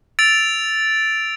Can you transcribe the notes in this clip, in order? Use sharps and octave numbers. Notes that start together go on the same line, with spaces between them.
E6 A6 D7 F7